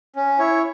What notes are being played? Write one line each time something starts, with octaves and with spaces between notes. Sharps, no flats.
C#4
E4 C#5